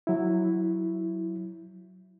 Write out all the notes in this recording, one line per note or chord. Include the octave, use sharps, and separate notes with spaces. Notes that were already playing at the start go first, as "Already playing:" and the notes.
F#3 E4